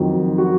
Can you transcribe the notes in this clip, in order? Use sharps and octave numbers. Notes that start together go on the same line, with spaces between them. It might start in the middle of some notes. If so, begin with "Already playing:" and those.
Already playing: F2 D#3 F#3
F#4